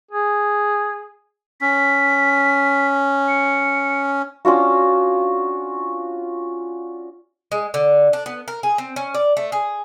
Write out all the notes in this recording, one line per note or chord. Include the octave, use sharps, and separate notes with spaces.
G#4
C#4 B6
C#7
C#4 D4 F4 F#4
G#3
D3
D4
B3
A#4
G#4
C4
C#4
D5
A3
G#4